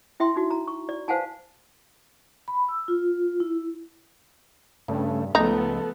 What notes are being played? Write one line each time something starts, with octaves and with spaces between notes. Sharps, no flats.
E4 E5 G5 C6
D#4 F#4
A#5
C#6
D5
B4 C5 F5 F#5 G#5 A5
B5
E6
F4
E4
G2 C#3 A3
C#2 F3 A3 B3 D#4 A4